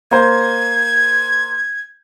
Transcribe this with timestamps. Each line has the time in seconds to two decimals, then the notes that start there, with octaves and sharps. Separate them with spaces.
0.11 A#3 C5 G#6